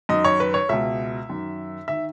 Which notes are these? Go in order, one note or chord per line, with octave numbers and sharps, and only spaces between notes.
F#2 D#3 D#5
C#5
B4
C#5
C#2 B2 E5
F#2 D#3
D#3 E5